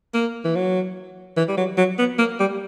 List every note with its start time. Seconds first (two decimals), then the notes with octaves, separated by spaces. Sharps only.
0.14 A#3
0.45 E3
0.56 F#3
1.37 E3
1.48 G3
1.57 F#3
1.77 F#3
1.99 B3
2.18 A#3
2.40 G3